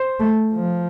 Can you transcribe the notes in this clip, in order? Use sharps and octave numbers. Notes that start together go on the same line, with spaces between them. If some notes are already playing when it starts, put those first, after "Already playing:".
Already playing: C5
A3
F3